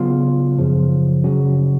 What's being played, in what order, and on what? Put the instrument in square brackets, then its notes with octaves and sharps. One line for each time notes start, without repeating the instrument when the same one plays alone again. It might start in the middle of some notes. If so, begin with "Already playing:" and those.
Already playing: [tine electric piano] C#3 F#3 B3 F4
F#2 C#3 F3
C#3 F#3 C#4 F#4